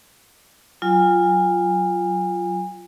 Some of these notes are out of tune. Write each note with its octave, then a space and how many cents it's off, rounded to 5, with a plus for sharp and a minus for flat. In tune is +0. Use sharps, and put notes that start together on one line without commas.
F#3 +0 F4 -5 G#5 -30